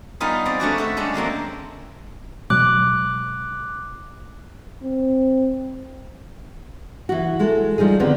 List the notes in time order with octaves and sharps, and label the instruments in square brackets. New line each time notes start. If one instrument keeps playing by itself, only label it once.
[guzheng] G3 B3 D#4 F4 G#4
C4 D5
A3 C#4 D4 F#4
A4 E5
G3 G#3 C#4 D4
F#3 G#3 A#3 C4
[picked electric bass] B2 F#3 G#3 [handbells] D6 F#6
[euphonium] C4
[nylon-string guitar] E3 F#4
G#3 F#4 A4
F3 G3 D#4 G#4
D3 D#3 B3 C4 D#4